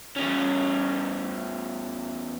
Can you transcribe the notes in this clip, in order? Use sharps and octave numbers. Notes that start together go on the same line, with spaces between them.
E2 C#4